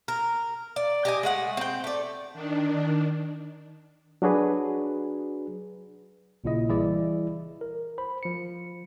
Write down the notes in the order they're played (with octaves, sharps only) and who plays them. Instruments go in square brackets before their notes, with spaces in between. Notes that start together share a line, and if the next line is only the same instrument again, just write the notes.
[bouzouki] A#4
D5
G4 D#5 G#5
G#3 A3 F#5
C4 G5
A3 D5
[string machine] D#3 D4
[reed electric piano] F#3 D4 F#4 G#4 B4
[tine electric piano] A#1 A#2 C#3 E4 D#5
E3 G3 E4 G#4 D5
A#4
C5 B5
F3 C#7